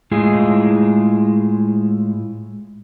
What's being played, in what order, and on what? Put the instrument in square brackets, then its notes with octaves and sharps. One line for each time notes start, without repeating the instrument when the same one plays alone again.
[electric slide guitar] A2 G#3 E4 F4 G#4